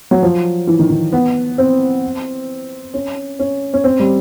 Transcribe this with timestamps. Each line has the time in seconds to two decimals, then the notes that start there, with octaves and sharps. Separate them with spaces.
0.11 F#3
0.23 F3
0.67 E3
0.79 D#3
0.90 D#3
1.13 B3
1.58 C4
2.94 C#4
3.39 C#4
3.74 C#4
3.84 C4
4.00 G3